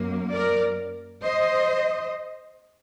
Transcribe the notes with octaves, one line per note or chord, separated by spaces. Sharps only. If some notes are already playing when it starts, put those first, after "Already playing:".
Already playing: F#2 F#3 A#3
A#4 D5
C5 D#5